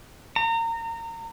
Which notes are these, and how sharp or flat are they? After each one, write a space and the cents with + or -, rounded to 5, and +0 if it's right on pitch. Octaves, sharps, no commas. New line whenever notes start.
A#5 -30